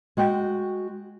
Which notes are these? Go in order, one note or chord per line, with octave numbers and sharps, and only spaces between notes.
G#3 F#4 F#5 G5